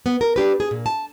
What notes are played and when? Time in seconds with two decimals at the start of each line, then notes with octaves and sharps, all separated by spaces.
0.06 B3
0.21 A#4
0.36 D4 G4 B4
0.60 G#4
0.71 A#2
0.86 A5